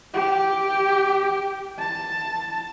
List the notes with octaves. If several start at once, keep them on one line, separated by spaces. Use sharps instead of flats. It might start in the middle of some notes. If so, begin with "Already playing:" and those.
G4
A5